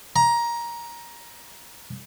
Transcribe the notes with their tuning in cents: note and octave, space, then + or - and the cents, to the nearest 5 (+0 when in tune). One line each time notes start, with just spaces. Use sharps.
A#5 +15